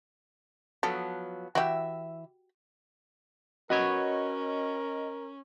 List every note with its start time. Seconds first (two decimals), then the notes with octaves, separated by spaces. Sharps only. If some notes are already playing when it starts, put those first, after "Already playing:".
0.83 F3 F#3 B3 A4
1.55 E3 F#4 G4 E5
3.70 C#4 F#4 A#4 B4 C#5 D#5